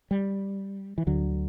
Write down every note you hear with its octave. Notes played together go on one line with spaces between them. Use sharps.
G3
E3
D2 D3 F#3